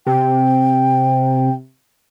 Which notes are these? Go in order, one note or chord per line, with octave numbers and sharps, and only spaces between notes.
C3 G5